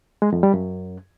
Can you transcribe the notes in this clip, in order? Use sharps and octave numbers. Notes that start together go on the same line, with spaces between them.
G#3
F2
G3
F#2